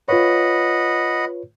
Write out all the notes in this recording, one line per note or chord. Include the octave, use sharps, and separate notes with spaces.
F4 B4 C#5 D#5 F#5 B5